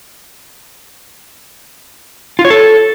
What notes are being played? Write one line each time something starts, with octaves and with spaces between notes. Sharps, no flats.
F4
C#5
A4